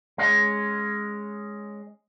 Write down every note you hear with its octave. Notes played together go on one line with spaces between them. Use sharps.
G#3 C#4